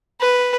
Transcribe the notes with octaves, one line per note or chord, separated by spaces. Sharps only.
B4